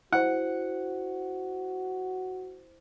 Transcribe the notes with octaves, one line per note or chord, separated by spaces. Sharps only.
E4 F#4 C5 F#5